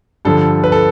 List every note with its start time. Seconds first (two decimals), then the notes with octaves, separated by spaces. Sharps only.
0.25 G2 D3 F3 A4
0.64 B4
0.72 A4